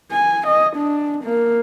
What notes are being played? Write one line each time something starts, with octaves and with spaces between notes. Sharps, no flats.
G#5
D#5
D4
A#3